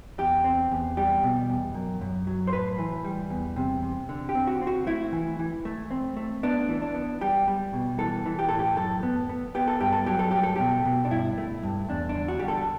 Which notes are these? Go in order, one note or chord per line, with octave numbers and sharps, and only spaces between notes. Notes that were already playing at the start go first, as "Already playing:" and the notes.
E2 G4
C4
E2
G3 G4
B2
E2
F#2
F#2
F#3
C5
A2 B4
E3
G3
E2
C3
C3
D3
G4
C4
F#4
C4
F#4
A3 E4
E3
E3
A3
C4
A3
B3 D4
E3
D4
B3
G3 G4
G3
B2
E3 A4
E3
G4
A2 A4
G4
F#2 A4
B3
B3
B3 G4
A4
G2 G4
A4
F#3 G4
A4
A3 G4
A4
B2 G4
B2
D4
G2 E4
A3
G2
E2 D4
D4
D3
F#4
G3 G4
A4